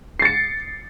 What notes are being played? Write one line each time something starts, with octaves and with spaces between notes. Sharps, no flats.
A6 C7 C#7